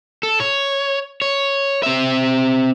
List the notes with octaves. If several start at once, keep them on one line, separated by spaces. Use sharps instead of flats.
A4
C#5
C#5
C4 E5